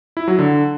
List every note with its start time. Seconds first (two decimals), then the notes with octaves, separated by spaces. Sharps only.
0.17 E4
0.28 F#3
0.39 D3